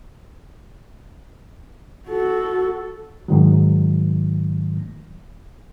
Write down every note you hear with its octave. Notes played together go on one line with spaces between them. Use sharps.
F#4 A4
G#2 D#3 F#3